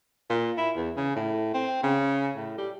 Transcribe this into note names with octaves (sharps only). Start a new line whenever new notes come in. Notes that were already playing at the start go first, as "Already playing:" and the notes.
A#2
E4
E2
C#3
A2
C4
C#3
A2
G3